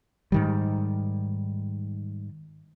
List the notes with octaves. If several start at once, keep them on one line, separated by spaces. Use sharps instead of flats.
G#2 D#3 G3